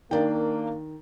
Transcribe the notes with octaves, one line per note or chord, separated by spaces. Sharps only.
D#3 A#3 D4 D5 G5